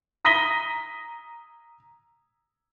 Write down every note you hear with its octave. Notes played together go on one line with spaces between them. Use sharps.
A#5 D#6 A#6 B6 D#7 G7